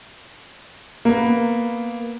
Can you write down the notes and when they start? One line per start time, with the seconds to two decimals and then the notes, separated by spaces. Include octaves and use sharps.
1.05 A#3 B3